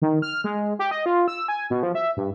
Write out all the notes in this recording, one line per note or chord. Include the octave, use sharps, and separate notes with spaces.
D#3
F6
G#3
G4
D#5
F4
E6
G#5
B2
F3
E5
G2